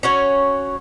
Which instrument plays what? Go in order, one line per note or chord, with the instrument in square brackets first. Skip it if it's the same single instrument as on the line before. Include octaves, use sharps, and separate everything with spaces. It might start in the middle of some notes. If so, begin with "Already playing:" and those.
[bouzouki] C#4 F#4 C#5